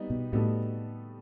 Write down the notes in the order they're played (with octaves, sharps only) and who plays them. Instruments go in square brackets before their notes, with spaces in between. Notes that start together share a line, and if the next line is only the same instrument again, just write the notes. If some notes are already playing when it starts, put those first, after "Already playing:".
Already playing: [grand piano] G3 B3 D#4
[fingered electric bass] B2
[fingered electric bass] A2 [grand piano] G3 B3 D#4 F#4 A4